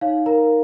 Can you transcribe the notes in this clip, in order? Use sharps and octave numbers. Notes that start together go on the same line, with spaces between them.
D#4 C#5 F5
A#4 A#5